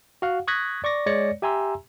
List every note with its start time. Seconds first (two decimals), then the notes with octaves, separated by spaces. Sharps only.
0.22 F#4 F5 F#5
0.48 C#6 D#6 F#6 G#6 A#6 B6
0.84 D5 C#6 D6 A#6
1.06 G#3 C#5 D5 A#6 C#7
1.42 G4 E5 G#5 A#5 C6 E6